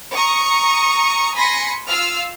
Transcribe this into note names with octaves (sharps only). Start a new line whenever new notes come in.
A#5 C#6 D#6
G#5 B5 C6 A#6 B6 C#7
F4 F5 E6 F6